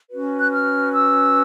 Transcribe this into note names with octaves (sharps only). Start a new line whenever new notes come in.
C#4 F#4 B4
F#6
F6
E6